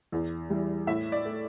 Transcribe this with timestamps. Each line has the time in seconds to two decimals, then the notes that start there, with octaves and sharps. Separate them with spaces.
0.12 E2
0.50 E3 G3
0.87 A2 E5
1.12 D5
1.25 A3